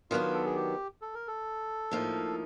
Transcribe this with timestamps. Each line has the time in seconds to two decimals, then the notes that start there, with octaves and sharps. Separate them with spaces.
0.11 D#3 F#3 B3 D4 F4
0.34 A4
0.45 G#4
0.56 G4
1.02 A4
1.14 A#4
1.28 A4
1.91 A2 F3 A#3 D#4